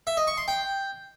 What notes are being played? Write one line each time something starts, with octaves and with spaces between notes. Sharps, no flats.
E5
D#5
C#6
C6
G5